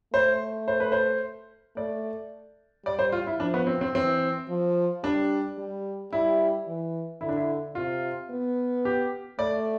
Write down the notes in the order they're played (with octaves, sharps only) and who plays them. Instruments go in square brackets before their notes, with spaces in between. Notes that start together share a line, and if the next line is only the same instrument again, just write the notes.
[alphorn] A3 [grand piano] C5
[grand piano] C5
B4
C5
[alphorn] A3 [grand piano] D5
[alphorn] G3 [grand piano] D5
[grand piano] C5
F4
E4
[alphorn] F3 [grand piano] D4
[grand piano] B3
C4
C4
[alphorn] E3 [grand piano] C4
[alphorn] F3
[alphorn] G3 [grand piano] D4
[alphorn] G3
[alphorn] G3 [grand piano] E4
[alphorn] E3
[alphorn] D3 [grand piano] E4
[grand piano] D4
E4
[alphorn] C3 [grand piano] F4
[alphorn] B3
[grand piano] G4
[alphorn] A3 [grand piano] D5